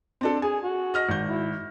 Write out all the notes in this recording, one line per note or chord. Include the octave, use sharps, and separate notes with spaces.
C4 D4 A4
G#4 G#5
F#4
D#5 F6 A#6
G#1 G6
E4